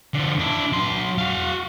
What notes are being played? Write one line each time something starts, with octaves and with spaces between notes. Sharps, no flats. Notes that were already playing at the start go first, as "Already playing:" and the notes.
D3 F3
D4 E4
F#3 C6
F#4 F5